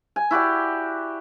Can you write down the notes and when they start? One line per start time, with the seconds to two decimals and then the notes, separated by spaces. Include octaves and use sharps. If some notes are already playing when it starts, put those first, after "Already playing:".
0.16 G#5
0.31 E4 F#4 G4 D5